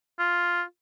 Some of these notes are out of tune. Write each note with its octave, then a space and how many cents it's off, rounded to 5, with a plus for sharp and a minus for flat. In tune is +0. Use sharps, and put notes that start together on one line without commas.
F4 +0